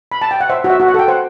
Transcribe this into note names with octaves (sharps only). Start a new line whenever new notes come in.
B5
A5
G5
F#5
C5 E5
F#4
E5
F#4
F#5
A4 G5
C5 F#5